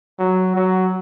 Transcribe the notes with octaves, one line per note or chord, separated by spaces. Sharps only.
F#3
F#3